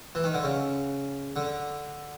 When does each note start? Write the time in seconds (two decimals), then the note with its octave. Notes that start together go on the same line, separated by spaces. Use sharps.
0.15 E3
0.24 D#3
0.34 D3
0.44 C#3
1.36 D3